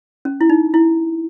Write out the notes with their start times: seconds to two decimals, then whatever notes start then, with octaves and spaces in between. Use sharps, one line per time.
0.25 C#4
0.41 E4
0.49 D#4
0.74 E4